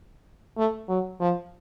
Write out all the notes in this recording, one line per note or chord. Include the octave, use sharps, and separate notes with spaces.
A3
F#3
F3